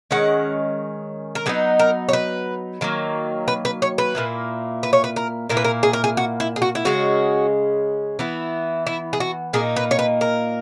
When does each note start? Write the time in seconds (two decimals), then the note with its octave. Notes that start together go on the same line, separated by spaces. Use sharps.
0.11 D#3 G#3 C#4 F#5
1.35 A#4
1.46 F#3 B3 D#4 G#4
1.80 A#4
2.09 C#5
2.13 B4
2.81 D#3 F#3 A#3
3.48 B4
3.65 B4
3.82 C#5
3.98 B4
4.15 A#2 F#3 A#3 E4
4.83 B4
4.93 C#5
5.04 B4
5.16 A#4
5.49 A#2 A#3 E4 A#4
5.57 B4
5.65 A#4
5.83 G#4
5.93 A#4
6.04 G#4
6.17 F#4
6.40 E4
6.56 G#4
6.62 F#4
6.75 E4
6.85 C#3 G#3 C#4 F#4
8.19 E3 B3 E4
8.87 E4
9.13 G#4
9.20 F#4
9.53 A#2 A#3 D#4 G#4
9.76 B4
9.91 C#5
9.99 B4
10.21 A#4